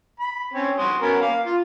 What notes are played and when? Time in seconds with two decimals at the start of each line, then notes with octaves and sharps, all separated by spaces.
0.20 B5
0.54 C4 C#4 C#5
0.78 F#4 C6 D#6
1.02 B3 C#4 A#4
1.21 A#3 F5
1.46 F4